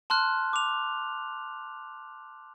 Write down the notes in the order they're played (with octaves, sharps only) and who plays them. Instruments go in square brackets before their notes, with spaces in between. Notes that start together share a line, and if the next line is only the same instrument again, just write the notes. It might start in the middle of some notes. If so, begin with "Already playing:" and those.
[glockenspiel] A5 C6 F6 F#6
D6 F7